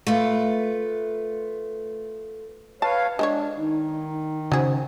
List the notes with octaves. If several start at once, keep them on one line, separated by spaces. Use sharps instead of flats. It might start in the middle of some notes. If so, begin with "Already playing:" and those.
A3 F4 B4
B4 C#5 F5 A5
G#3 D4 C5 C#5
D#3 D#4
C#3 F#3 G#4 C5